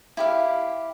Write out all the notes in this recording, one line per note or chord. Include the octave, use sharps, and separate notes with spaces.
E4 G4 F5